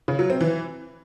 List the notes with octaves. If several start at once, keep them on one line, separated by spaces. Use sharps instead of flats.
C#3
F#3
C4
E3